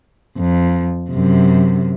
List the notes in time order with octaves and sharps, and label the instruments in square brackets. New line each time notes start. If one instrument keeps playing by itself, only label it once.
[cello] F2
F#2 C3